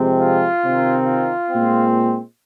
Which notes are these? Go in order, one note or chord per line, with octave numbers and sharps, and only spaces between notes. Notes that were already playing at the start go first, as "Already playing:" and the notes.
Already playing: F2 C3 G#3 C4
F4
C3 D#3 C4 D#4
F4
A#2 G#3 C4